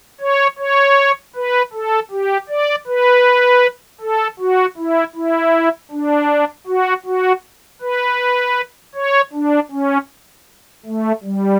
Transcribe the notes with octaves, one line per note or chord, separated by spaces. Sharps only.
C#5
C#5
B4
A4
G4
D5
B4
A4
F#4
E4
E4
D4
F#4
F#4
B4
C#5
D4
C#4
A3
G3